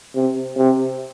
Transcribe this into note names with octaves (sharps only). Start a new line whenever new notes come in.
C3
C3